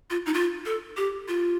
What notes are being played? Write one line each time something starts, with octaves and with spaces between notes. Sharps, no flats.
F4
D#4
F4
A4
G4
F4